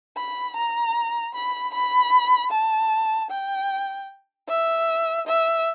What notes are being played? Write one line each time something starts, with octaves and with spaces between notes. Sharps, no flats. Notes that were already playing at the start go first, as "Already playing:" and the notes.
B5
A#5
B5
B5
A5
G5
E5
E5